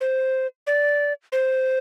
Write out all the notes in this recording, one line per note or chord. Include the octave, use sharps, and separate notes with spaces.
C5
D5
C5